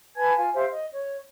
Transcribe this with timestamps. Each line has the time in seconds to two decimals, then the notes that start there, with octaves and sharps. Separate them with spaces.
0.15 B4 G#5 A5 G#6
0.37 F4 F5 G#5
0.54 G4 C5 E5 F5
0.70 D#5
0.92 C#5